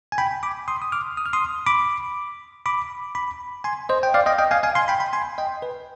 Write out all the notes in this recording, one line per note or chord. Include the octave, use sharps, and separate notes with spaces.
G#5
G5 B5
B5 D6
C6 D#6
D#6
D6 F6
D#6
F6
C6 D#6
B5 D6
B5 D6
B5 D6
G#5 C6
C5 D#5
G5
D5 F5
D#5 G5
D#5 G5
F5 G#5
F5 G#5
G#5 C6
G5 B5
G5 B5
G#5 C6
D#5 G5
B4